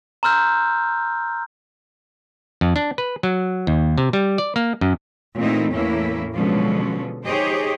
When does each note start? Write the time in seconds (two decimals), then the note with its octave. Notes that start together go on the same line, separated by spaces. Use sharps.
0.23 A#5 C6 E6 F6 G6
2.61 F2
2.76 D4
2.98 B4
3.23 F#3
3.67 D#2
3.98 C3
4.13 G3
4.38 D5
4.56 A#3
4.81 F#2
5.38 A#2 E3 A3 C4 D#4 E4
5.72 E2 A2 E3 A#3 C#4 E4
6.36 B2 D3 F3 F#3 G#3 C#4
7.26 D#4 G4 G#4 C5 C#5 D#5